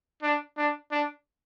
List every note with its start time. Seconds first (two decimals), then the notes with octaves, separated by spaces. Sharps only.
0.23 D4
0.57 D4
0.91 D4